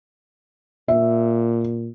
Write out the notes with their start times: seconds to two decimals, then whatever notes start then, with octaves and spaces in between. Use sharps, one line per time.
0.88 A#2 E5